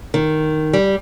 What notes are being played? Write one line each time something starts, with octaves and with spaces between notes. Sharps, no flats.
D#3
G3